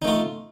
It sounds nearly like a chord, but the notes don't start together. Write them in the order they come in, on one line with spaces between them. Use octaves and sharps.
D#4 A3 F4